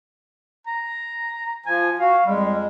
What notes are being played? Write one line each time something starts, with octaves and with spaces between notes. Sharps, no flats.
A#5
F3 G#5
F#4 F5
F2 G3 G#3